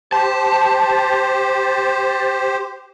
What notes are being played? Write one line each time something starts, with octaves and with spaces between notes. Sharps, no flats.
G4 C5 A5